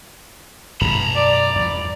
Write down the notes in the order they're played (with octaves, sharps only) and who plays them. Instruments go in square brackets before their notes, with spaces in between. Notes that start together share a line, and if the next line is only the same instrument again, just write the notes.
[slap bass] F#2 B2 G#3 [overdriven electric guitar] A#5 B5
[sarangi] D5
[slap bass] E2 G2 F3